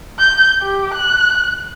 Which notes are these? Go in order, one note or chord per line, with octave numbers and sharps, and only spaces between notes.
G6
G4
F#6